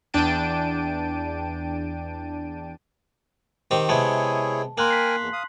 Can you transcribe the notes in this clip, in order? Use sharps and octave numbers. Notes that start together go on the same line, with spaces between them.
E2 D4 G5 A5 D7 D#7
D#3 C4 G4
C3 G#3 B3 E4 G#4 C#5 A5
A#3 A#4 G5 G#5 C6 F#6 F#7
B6 C7
E2
F5 D#6